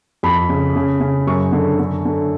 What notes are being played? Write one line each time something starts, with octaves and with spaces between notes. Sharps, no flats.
F2 B5
C#3
C#3
C#3
F#2 C#6
D3
D3
D3